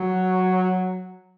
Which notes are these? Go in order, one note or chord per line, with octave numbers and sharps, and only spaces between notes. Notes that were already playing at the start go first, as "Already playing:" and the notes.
Already playing: F#3